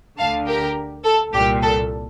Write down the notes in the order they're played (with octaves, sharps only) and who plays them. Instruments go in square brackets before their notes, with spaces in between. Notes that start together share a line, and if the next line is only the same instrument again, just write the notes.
[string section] D2 D3 F5 A5
G4 A#4
A4
C2 A#2 G4
A4